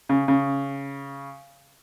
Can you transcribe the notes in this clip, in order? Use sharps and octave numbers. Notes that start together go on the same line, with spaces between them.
C#3
C#3